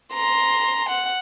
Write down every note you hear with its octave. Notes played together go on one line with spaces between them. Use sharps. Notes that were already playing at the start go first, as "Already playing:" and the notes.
A#5 C6
F#5